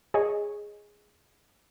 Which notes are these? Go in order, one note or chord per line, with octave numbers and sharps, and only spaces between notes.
G#4 C#5 D#5